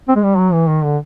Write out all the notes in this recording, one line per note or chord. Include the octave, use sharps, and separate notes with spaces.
C4
G#3
G3
F#3
E3
D#3
D3